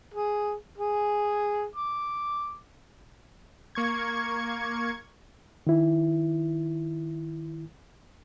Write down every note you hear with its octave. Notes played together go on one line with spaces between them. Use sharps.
G#4
G#4
D6
A#3 C#6 G#6
D#3 E4